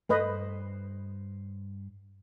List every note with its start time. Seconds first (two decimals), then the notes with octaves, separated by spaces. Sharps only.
0.09 G2 A3 B4 C5 D#5